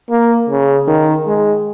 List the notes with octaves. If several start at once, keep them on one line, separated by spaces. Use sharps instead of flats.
A#3
C#3
D#3
G#3